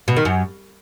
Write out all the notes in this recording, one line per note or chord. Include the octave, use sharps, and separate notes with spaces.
B2
D#3
F#2